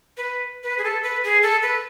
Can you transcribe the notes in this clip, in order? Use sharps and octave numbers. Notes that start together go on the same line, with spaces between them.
B4
B4
G#4
A4
B4
G#4
A4
B4